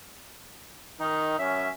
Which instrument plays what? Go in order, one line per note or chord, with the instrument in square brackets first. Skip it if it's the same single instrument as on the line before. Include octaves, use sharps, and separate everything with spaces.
[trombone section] D#3 [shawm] D#4
[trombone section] F#2 C#4 [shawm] E5